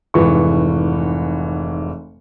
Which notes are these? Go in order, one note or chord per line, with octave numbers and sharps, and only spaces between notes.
F1 G#2 E3 C#6